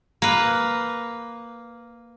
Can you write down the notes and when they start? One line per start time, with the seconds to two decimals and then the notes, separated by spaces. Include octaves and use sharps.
0.22 A#3 B4